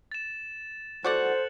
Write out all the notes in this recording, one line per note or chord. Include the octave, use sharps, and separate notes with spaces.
A6 E7
F#4 A4 C5 D5 F#5 F#6 C#7 F#7